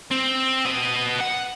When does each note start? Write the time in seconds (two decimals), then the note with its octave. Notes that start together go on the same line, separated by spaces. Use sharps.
0.11 C4
0.65 B3 D#5
1.21 F#5